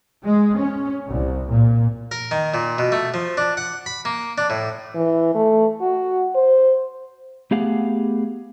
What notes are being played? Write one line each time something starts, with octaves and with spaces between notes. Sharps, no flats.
G#3
C#4
C2
A#2
A#4
D#3
A#2
B2
A3
F3
D4
F#5
B5
A#3
D4
A2
E3
A3
F#4
C5
A3 B3 G4 G#4 F5 F#5